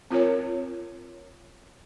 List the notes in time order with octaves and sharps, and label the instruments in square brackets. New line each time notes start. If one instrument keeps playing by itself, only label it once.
[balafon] C4 F4 A#4 C#5